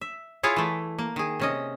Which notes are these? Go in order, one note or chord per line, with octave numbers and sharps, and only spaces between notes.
E5
E4 F4 G#4 C#5
E3 A3
A#3
D#3 G#4
C3 C#4 D#5